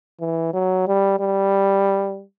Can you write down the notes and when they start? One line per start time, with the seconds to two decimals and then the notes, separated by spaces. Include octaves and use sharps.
0.20 E3
0.53 F#3
0.88 G3
1.20 G3